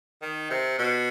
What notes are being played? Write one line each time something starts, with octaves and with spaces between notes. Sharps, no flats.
D#3
C3
B2